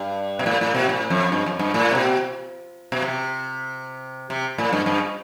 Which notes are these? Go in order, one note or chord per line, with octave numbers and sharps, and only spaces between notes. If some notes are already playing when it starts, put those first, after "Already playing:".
Already playing: G2
B2
A2
A2
B2
A2
F2
G2
F2
G2
A2
C3
B2
B2
C3
C3
A2
G2
G2